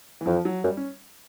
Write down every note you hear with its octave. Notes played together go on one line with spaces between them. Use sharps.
E3
F2 F3
F#3
F#2 G3
C#4